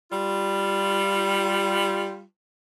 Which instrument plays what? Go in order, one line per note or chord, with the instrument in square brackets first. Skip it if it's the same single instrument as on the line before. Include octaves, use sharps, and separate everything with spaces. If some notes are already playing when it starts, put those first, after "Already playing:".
[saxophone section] G3 F4